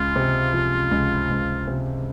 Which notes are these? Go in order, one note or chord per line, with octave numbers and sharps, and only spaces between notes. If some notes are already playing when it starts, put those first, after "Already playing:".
Already playing: C#2 F4
C3
F3
C#2
C#2
C3